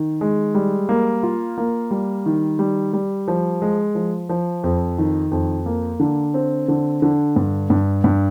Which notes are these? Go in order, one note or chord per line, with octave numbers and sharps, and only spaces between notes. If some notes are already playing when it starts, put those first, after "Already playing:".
Already playing: D#3
G#3
G3
A#3
F4
A#3
G3
D#3
G3
G3
F3
G#3
F3
F3
F2
D#3
F2
A#3
D3
C4
D3
D3
G2
G2
G2